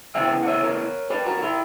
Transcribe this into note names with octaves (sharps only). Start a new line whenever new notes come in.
C#3 E3 B3 E5 G5
F#5
C#5 E5
A#4 C#5
G4 B4
F#4 A#4
F#4
E4 G4